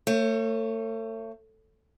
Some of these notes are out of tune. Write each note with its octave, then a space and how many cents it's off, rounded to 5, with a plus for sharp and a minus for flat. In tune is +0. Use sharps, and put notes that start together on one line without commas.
A3 +35 C#5 -25